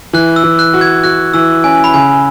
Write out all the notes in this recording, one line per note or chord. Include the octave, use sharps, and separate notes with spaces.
E3 F#6
E6
E3
F#6
F#4
G#6
F#4 F#6
E3 E6
C#4 G#5
B5
C#3 G#5